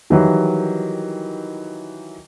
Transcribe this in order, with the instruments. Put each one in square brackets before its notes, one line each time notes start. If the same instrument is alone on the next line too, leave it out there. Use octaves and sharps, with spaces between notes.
[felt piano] D#3 E3 F#3 G3